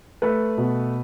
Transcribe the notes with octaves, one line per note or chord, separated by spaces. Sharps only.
A3 B4
B2